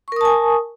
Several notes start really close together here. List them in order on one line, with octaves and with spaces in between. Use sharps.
C#6 A#4 D#6 A5 G#5